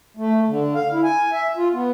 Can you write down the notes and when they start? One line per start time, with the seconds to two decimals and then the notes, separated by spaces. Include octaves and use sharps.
0.17 A3
0.48 D3
0.74 F5
0.92 E4
1.04 G#5
1.32 E5
1.57 F4
1.73 B3